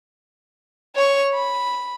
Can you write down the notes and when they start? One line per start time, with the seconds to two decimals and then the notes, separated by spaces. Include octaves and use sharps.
0.96 C#5 C#6
1.34 B5